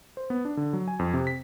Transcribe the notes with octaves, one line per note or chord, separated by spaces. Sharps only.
C5
B3
D4
D3
F#3
G#5
F2
C3
B6